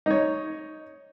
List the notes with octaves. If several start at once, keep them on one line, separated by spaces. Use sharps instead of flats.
D#4 C#5